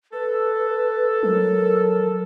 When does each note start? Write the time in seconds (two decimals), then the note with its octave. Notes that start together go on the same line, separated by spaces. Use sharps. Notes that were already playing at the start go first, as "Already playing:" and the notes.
0.13 A4 B4
1.23 F#3 A#4